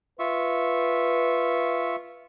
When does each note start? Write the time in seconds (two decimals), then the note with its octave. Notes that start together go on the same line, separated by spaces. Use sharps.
0.19 F4 B4 E5 C#6